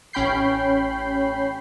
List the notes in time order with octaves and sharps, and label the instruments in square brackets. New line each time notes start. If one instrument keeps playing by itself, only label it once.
[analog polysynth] A1 C#4 G5 B5 G6 C7